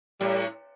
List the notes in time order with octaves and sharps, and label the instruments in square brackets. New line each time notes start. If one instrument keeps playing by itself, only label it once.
[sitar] A2 [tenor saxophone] G3